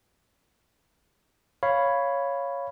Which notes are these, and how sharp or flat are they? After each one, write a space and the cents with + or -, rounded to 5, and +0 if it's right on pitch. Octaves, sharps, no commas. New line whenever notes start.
C#5 +0 F5 -5 B5 +0